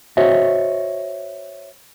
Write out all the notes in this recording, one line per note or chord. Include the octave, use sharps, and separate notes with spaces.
F#4 C5 C#5 D#5 E5